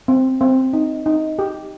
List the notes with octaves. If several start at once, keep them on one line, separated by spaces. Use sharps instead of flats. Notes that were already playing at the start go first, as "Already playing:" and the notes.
C4
C4
D#4
D#4
G4